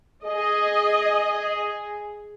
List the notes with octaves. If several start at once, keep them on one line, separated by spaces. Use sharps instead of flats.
G#4 D#5